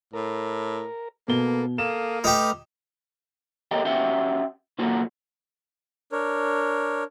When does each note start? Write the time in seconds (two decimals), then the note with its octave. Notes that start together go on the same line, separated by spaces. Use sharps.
0.13 A2 A#4
1.28 B2 A#3 B3 A4 G7
1.78 A#3 A4 F5 D#6 E7
2.24 A3 D#4 G4 B4 F6
3.71 G4 A4 A#4 D#5 G5
3.85 C#4 F#4 G4 E5 F#5 G5
4.79 B1 A#3 F4 F#4 A4 F#5
6.12 D4 A#4 C#5